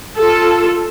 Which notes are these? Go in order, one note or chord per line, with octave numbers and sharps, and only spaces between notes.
F4 A4